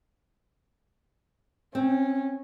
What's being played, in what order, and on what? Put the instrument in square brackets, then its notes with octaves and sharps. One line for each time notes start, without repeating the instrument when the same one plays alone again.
[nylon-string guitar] C4 [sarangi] C#4